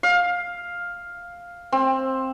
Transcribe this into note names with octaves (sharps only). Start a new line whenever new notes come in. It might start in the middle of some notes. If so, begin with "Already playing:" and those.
F5
C4